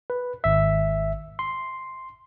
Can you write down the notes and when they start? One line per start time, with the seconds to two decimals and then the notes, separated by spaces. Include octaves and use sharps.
0.10 B4
0.44 G#1 E5
1.39 C6